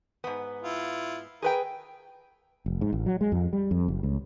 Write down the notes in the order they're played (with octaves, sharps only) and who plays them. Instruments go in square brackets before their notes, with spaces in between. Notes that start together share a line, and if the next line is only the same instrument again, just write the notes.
[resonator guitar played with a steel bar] G#2 B3
[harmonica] E4 F4
[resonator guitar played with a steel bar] G#4 B4 G5 [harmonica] A#4
[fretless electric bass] F1
G#2
A1
F#3
G#3
F2
G3
F2
F#1
C#2